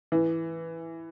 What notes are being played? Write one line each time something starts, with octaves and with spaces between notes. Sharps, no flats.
E3